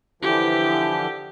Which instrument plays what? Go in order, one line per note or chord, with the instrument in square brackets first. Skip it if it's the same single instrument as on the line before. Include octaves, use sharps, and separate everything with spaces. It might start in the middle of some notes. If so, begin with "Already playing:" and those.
[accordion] D3 E3 F3 [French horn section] E4 [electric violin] G4